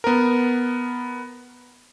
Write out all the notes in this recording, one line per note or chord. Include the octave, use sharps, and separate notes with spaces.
B3 A#4